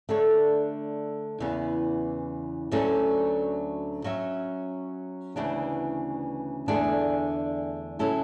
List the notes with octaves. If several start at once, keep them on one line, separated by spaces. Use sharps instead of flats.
D3 A3 D4 A4 C#5
E2 C#3 E3 B3
D2 D3 F#3 A3 C#4
F#3 C#4 F#4 C#5 E5
D2 C#3 E3 B3 D4
E2 D3 A3 D4 G#4
C#3 F#3 C#4 E4 A4